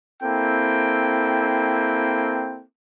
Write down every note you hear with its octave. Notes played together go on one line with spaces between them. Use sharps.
A#3 C4 E4 A4 G5